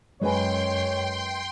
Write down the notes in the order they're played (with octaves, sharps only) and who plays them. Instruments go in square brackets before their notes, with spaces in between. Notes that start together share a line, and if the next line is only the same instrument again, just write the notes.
[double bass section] F#2 [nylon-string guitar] G#3 B4 G#5 [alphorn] C#5 [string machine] G5 C6